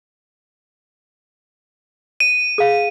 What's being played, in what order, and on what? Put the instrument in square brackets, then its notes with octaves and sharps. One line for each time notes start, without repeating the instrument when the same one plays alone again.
[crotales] D#7
[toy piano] G#4 F5